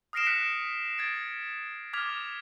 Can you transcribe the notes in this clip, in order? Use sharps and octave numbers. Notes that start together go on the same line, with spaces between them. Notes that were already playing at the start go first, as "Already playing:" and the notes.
D#6 F6 A#6 C7 D7 E7
F6 F#6 B6 C#7 D7 E7
G#6 A6 D7
D6 F6 G#6 B6 F7